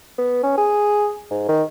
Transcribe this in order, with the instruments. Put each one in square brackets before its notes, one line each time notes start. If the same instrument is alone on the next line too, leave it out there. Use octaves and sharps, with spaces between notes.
[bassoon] B3
C#4
G#4
G#2
D#3